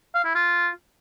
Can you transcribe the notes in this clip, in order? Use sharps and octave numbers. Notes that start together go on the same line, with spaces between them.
F5
E4
F4